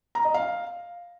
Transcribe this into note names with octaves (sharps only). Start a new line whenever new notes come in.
A#5
D#5
F5